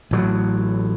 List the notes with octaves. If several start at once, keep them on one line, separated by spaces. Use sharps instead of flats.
A1 A2 F#3